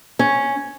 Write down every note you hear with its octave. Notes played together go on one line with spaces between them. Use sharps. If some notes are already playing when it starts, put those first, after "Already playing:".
C#4